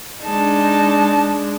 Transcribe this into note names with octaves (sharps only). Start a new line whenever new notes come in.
G#3 D4 D#4 A5